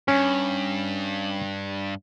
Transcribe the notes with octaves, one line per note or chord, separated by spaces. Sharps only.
G2 C#4